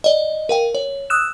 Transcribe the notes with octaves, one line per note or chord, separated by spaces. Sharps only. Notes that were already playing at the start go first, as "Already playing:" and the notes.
D5 D#5
A#4 F5 G5
C#5
D#6 E6 F#6 E7